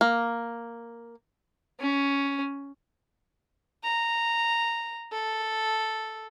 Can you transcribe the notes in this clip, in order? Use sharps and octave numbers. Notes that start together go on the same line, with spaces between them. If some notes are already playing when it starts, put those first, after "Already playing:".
A#3
C#4
A#5
A4